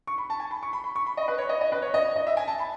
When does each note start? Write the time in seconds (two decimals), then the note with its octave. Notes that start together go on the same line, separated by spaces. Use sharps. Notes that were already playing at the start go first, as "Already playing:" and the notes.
0.07 C#6
0.18 B5
0.30 A5
0.40 G#5
0.51 B5
0.63 C#6
0.73 B5
0.84 B5
0.96 C#6
1.06 B5
1.17 D#5
1.28 B4
1.38 C#5
1.49 D#5
1.61 D#5
1.72 B4
1.82 C#5
1.94 D#5
2.16 D#5
2.27 E5
2.37 G#5
2.48 A5
2.59 B5